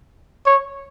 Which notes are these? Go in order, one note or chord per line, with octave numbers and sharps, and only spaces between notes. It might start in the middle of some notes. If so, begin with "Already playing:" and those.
C#5